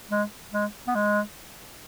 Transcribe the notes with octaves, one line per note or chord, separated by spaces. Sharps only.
G#3
G#3
B3
G#3